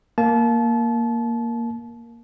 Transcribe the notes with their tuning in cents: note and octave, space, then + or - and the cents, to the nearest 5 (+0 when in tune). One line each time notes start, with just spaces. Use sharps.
A#3 +0 A5 -30